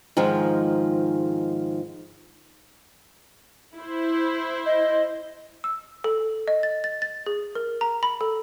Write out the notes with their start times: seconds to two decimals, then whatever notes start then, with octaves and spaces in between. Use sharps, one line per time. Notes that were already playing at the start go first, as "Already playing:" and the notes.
0.17 G#2 D#3 F3 G#3
3.75 E4 C5
4.66 D#5
5.64 E6
6.04 A4
6.48 D#5
6.63 A6
6.84 A6
7.02 A6
7.26 G#4
7.55 A#4
7.81 A#5
8.03 B5
8.21 A4